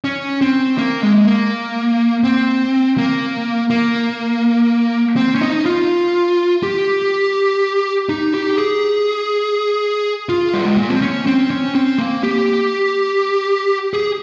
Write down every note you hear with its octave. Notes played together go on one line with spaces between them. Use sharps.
C#4
C4
A#3
G#3
A#3
C4
A#3
A#3
C4
C#4
D#4
F4
G4
D#4
G4
G#4
F4
G3
G#3
A#3
C4
C#4
C4
C#4
C4
A#3
G4
G#4